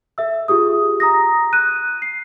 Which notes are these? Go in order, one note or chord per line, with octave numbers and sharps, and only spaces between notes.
A4 E5 E6
F4 G4 G#4 D#6
A#5 D#6 A#6
F#6 D#7
C7